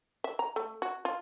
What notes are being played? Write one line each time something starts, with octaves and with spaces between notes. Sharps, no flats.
E5
A#5
A3
F#4
F4